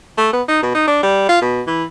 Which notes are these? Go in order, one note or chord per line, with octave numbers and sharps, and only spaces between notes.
A3
B3
D#4
B2
D#4
D4
G3
F4
B2
E3